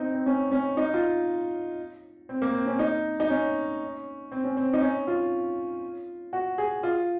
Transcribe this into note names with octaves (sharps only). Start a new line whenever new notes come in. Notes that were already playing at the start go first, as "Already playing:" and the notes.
Already playing: C4 D#4
C4
C#4
C#4
D#4
F4
C4
A#3
C4
C#4
D#4
D#4
C#4
C4
C#4
C4
D#4
C#4
F4
F#4
G#4
F4